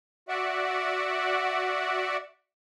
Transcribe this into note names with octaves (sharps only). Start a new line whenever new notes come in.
F#4 D5 E5 F#5